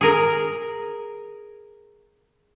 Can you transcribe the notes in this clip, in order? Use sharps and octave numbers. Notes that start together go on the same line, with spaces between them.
G#4 A#4